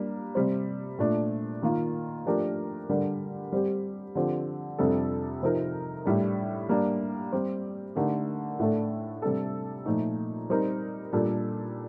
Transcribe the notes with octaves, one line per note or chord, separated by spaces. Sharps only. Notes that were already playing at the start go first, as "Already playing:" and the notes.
Already playing: G3 A#3 D4
C3 G3 C4
A#2 A3 D4
D#3 A#3 F4
F3 A3 D4 G4 A#4
D3 G3 D4 G4 A#4
G3 C4 G4
D3 F3 C4 G4
F2 C3 G3 D4 A4
C3 F3 C4 D#4 A#4
A2 G3 D4
G3 A#3 D4
G3 C4 G4
D3 A3 D#4 G4 A#4
A2 A3 D4 A4
C3 G3 D4 A4
A#2 F3 A3 D#4
G3 C4 D#4 A#4
A#2 G3 D4 A4